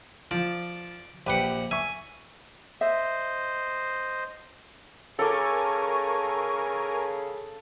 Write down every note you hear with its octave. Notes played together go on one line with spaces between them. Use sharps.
F3 D5
A#1 G4 B4 F#5 G5
E5 G#5 C#6
C5 D#5 E5
C#3 A4 A#4 G#5 C#6 D6